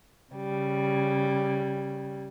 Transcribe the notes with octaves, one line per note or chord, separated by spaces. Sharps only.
C#3 G3